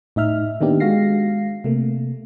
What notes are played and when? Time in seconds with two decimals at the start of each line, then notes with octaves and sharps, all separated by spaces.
0.16 A2 D#4 E5 F6
0.61 D#3 A#3 B3 D4 D#4 G4
0.80 G#3 F#4 F5 A#6 C7
1.64 C3 A3 A#3